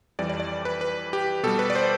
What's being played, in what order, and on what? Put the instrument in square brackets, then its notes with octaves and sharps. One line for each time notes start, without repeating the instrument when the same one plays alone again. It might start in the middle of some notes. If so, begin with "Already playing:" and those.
[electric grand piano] F2 E3 G3 D5
D5
D5
B4
B4
G4
B2 G3 A4
B4
D5
C5